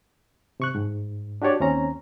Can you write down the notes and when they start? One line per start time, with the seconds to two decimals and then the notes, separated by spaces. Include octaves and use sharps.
0.60 C3 C#6 F#6
0.75 G#2
1.42 D4 F#4 G4 C#5 D5
1.60 D#2 C4 C#4 A#5